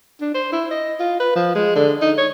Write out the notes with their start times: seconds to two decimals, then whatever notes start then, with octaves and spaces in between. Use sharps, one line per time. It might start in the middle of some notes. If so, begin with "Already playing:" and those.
0.21 D4
0.34 C5
0.52 E4
0.71 D#5
0.99 F4
1.20 B4
1.35 F3
1.55 G#3
1.76 D3
2.01 D#4
2.18 C#5